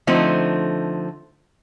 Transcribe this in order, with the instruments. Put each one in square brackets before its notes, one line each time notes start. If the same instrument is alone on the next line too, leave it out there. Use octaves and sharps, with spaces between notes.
[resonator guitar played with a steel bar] D3 F3 A3 C4 D#4